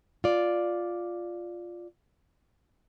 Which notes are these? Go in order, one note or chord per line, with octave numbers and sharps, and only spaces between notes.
F4 D5